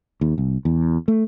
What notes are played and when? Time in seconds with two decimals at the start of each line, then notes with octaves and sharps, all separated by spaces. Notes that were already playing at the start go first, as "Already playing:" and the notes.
0.21 D#2
0.38 C2
0.65 E2
1.08 A3